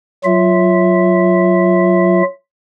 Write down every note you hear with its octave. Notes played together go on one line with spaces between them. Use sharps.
F#3 F4 E5